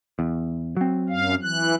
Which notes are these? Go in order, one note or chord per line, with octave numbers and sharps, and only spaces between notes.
E2
F#3 C4
F#2 F5
E3 F#6